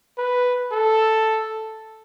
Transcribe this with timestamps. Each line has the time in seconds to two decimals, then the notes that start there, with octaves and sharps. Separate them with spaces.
0.18 B4
0.72 A4